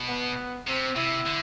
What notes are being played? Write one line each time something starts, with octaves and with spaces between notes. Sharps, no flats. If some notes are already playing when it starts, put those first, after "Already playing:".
Already playing: B2
B3
C3 C4
C3 E4
D3